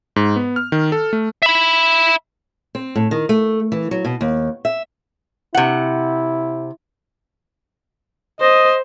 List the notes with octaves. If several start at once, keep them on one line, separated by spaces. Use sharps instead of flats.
G#2
B3
F6
D#3
A4
A3
E5 B5
C4
A2
D#3
A3
E3
F#3
B2
D#2
E5
C3 E4 F#5
C5 D#5